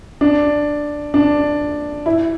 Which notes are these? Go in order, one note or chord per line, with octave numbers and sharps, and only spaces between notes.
D4
D4
E4